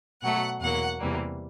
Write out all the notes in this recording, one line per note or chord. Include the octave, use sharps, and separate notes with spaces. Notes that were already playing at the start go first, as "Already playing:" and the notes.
B2 F#3 A3 F#5
E2 B2 F#3 A#3 F#5
E2 C3 E3 G3 A#3